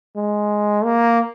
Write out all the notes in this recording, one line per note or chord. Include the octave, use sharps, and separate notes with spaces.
G#3
A#3